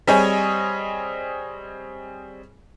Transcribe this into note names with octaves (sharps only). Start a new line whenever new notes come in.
G3 C4 G#4 C#5 D#5 G#5